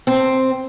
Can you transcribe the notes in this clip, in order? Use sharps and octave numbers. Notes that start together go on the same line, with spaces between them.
C4